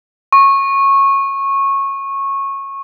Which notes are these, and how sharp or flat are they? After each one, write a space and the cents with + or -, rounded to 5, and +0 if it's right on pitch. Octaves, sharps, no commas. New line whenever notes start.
C#6 -15